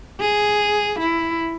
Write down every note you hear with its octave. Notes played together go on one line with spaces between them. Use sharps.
G#4
E4